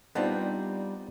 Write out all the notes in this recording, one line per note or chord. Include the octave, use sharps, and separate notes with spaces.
G3 B3 C4 D4 D#4 F4